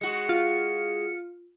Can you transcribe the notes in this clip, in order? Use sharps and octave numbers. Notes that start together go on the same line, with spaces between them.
G#3 F#4 C#7
F4